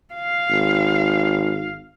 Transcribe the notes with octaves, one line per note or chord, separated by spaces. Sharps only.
F5
G#1